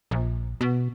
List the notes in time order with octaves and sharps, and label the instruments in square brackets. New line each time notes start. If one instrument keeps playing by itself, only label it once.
[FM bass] A#1
B2